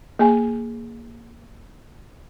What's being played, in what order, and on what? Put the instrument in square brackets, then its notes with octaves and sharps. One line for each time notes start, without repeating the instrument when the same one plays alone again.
[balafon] A#3 G#4 G#5